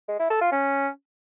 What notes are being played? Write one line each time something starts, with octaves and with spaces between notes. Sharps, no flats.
G#3
E4
A4
F4
C#4